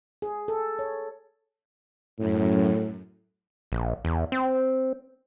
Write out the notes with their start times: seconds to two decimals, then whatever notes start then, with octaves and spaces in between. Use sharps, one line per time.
0.22 G#4
0.48 A4
0.79 C#5
2.19 F#2 A2
3.72 A#1
4.05 E2
4.32 C4